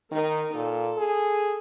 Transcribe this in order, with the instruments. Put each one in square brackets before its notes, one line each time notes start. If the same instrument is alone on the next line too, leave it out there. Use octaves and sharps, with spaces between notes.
[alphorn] D#3 [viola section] D#4 A#4
[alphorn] A#2 [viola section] A4
[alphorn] G#4